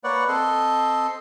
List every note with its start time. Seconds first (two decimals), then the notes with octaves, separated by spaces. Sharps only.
0.04 A#3 B4 C#5 D5 F#5
0.28 C4 A4 D#5 C6